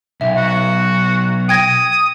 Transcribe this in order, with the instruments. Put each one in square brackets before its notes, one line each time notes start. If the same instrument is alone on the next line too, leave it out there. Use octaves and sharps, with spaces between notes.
[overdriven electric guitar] B1 [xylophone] E5
[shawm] F#4
[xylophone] G5 G#6 A#6 [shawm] D#6